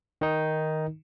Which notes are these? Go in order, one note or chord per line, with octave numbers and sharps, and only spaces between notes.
D#3 D#4